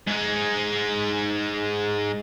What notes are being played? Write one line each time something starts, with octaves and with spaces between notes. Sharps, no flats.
G#2 G#3